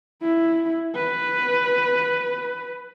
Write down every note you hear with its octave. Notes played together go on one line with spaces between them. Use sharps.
E4
B4